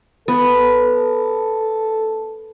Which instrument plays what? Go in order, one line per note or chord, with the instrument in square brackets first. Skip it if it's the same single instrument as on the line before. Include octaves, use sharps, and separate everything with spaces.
[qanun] B3 [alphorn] A4